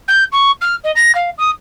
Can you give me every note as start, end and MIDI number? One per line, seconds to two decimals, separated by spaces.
0.08 0.24 91
0.32 0.51 85
0.61 0.75 89
0.84 0.91 75
0.95 1.14 94
1.15 1.30 77
1.38 1.50 87